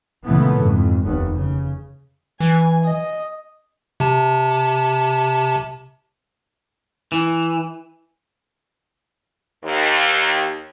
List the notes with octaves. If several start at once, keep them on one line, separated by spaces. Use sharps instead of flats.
C#2 A#2 C#3 E3 A3 B3
F2 G#2
F1 D#2 B3
C#3
E3 G#5
D#5
C3 A5
E3
D#2